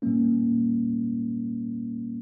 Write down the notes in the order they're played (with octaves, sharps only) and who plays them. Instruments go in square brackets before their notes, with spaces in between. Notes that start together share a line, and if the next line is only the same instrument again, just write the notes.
[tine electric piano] A#2 G3 A#3 C#4